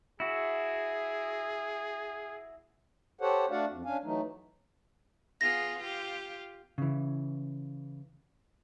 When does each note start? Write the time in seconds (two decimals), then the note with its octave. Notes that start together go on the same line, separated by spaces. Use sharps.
0.20 E4 F#4 G#4
3.21 G4 A4 C5 C#5 F#5
3.50 A3 D4 F#4 D5 F5 F#5
3.69 F2
3.85 C#4 D4 F5 G#5
4.03 E3 F#3 A3 D#4
5.41 B3 F4 G#4 A#6
5.79 F4 G4
6.78 C#3 E3